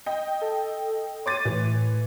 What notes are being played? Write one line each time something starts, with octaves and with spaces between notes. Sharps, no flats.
D#5 G5
A4
C#5 C6 D6 A6 D#7
A2 E3